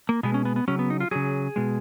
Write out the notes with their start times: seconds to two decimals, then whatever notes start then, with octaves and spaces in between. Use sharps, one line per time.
0.09 A#3
0.23 B2 G#3 B3
0.34 C#4
0.45 B3
0.56 B3
0.68 C#3 F#3 C#4
0.79 B3
0.90 D#4
1.00 F4
1.11 C#3 F#3 G#4
1.56 B2 G#3